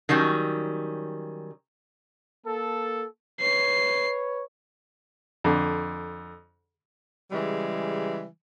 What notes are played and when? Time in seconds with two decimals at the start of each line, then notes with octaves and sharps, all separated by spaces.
0.09 D#3 F#3 G3 C#4
2.45 A#3 A4
3.40 B4 C#5 C7
5.44 F2 D3
7.31 C#3 E3 G3 G#3